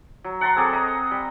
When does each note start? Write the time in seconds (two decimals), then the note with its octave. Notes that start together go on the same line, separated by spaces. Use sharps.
0.24 F#3
0.41 F#5 A5 A#5 C6
0.56 C4 G#4 A4 D6
0.73 D#5 A#5
1.11 G3